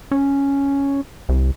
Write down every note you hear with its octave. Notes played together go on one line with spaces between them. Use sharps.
C#4
C2